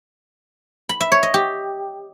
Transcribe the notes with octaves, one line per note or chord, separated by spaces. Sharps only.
B5
E5
C#5
D#5
G4